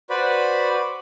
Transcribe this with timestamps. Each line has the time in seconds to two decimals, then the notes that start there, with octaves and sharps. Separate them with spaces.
0.10 F#4 B4 C5 D5 B5